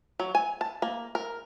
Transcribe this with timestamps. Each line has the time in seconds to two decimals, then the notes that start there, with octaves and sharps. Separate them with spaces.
0.20 F#3
0.35 G#5
0.61 A5
0.82 A#3
1.15 A#4